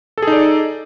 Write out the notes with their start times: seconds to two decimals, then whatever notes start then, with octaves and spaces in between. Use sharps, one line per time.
0.18 A4
0.22 G#4
0.27 D#4
0.32 D5